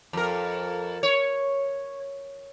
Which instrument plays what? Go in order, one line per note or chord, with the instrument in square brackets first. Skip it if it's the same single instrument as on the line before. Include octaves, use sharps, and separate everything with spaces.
[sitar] F2 A#4
C#5